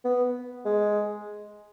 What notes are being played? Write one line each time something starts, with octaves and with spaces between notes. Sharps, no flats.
B3
G#3